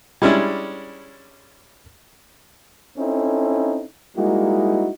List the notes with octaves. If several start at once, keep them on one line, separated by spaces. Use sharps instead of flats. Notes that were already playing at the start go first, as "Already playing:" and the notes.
G3 G#3 C#4 D4 E4
C4 C#4 D#4 E4 A4
G3 G#3 A#3 D#4 E4 F#4